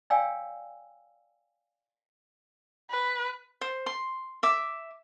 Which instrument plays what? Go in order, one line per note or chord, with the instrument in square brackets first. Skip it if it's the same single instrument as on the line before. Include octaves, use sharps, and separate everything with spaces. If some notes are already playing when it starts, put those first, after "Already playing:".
[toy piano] C#5 D5 F5 G5 G#5 E6
[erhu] B4
[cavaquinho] C5
C6
E5 D6